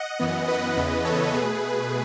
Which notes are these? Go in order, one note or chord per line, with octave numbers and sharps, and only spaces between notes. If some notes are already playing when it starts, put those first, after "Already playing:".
Already playing: D#5 F#5
F#2 E3 B3
B4 D#5
E2 C#3 E3 B3
A4 C#5
B2 A3 G#4 B4